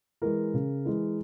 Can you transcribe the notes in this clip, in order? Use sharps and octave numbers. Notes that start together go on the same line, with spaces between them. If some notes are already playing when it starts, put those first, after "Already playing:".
E3 G#3 A#4
C#3
E3 G#3